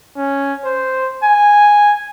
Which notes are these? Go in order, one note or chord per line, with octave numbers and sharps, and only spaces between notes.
C#4
C5
G#5